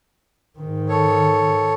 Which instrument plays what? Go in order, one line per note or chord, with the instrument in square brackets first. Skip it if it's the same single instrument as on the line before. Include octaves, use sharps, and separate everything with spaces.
[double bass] G#2 D#3
[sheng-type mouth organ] A4 C#5